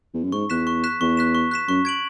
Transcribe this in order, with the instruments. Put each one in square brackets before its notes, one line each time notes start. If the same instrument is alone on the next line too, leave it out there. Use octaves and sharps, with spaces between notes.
[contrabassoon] E2
F#2
[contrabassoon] G#2 [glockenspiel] C#6
[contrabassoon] E2 [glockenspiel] F#6 B6 E7
[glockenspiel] C#6
F#6 B6 E7
[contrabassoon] E2 [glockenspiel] C#6
[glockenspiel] F#6 B6 E7
C#6
F#6 B6 E7
[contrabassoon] F#2 [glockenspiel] C#6
[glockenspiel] G#6 D7 F#7